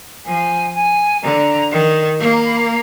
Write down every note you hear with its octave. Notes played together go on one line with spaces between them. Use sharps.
F3 G#5
G#5
D3 A#5
D#3
A#3
A#5
B5
A#5